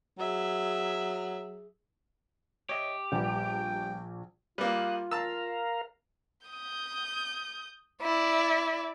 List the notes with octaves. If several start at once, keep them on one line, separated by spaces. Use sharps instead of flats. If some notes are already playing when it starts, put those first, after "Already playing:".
F#3 G#4 E5
G4 C#5 D#5 E5
A#1 G3 B3 G5
G3 A#3 F4 F5 D#6 F#6
A#4 F5 A5 A#5 E6
D#6 G6
E4 D5